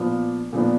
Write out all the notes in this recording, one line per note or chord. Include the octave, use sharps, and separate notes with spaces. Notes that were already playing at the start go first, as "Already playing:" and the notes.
Already playing: A#2 F3 B3 D4
A#2 F3 B3 D4